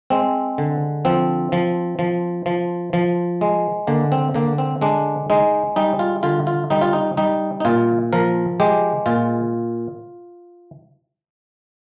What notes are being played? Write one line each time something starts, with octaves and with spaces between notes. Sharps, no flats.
G#3 C4
D3
F3 C4
F3
F3
F3
F3
G#3
D3 A#3
C4
D3 A#3
C4
G#3 D4
G#3 D#4
G3 D#4
F4
D3 F4
F4
G3 D#4
F4
D#4
G3 D#4
D#4
A#2 F4
F3 A#4
G#3 G4
A#2 F4